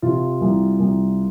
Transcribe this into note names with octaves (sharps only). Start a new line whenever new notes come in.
C3 F4
C2
C2